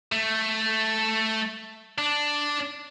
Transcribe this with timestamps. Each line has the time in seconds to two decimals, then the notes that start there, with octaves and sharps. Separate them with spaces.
0.12 A3
1.98 D4